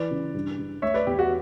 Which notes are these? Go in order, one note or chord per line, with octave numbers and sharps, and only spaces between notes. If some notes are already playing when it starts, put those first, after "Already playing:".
Already playing: E3 B4 D5
C#3
G2
G2
A3 C#5 E5
B4 D5
E2 G4
F#4